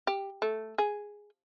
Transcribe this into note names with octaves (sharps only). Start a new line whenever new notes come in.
G4
A3
G#4